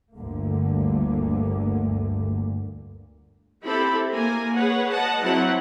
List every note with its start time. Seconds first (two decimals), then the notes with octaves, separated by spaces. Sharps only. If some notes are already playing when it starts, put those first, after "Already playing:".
0.15 G1 D2 G2 D3 A#3
3.63 C4 E4 G4 A4 B5
4.12 A#3 A#4 G#5
4.54 G#4 B4 C#5 F#5
4.90 D#5 F#5 A5
5.23 F#3 C4 E4 F#5